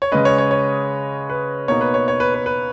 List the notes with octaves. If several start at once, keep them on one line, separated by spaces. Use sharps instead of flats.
C#5
C#3 G#3 C#4 B4 D#5
C#5
C#5
C#5
B4
B2 A#3 D#4 C#5
B4
C#5
C#5
B4
B4
B4